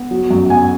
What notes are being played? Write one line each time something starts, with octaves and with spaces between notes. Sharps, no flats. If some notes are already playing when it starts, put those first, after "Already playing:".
Already playing: B3
F#3
F#2
B3 G#5